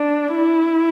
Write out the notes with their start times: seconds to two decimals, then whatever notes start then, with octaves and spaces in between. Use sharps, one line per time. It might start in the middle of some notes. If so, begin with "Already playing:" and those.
Already playing: D4
0.35 E4